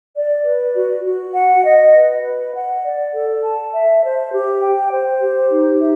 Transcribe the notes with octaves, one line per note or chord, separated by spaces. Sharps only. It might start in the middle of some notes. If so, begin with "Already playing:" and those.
D5
B4
F#4
F#4
F#5
D#5
B4
B4
F#5
D5
A4
A5
E5
C5
G4
G5
C5
G4
D#4
E5